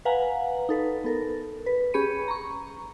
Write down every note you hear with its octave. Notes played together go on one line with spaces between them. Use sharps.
B4 F5 F#5 G#5 A#5
D#4 A4 B4
B3 A4 A#4
B4
C#4 G4 G#4 B5 C#7 D#7
A#5 C#6